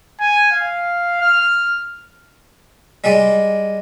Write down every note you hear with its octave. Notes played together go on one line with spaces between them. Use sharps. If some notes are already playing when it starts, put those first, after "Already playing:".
G#5
F5
F6
G3 G#3 D5